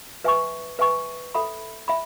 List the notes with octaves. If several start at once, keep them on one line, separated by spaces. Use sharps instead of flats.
B4 E5 G#5 C#6
B4 E5 G#5 C#6
A4 E5 B5
E5 B5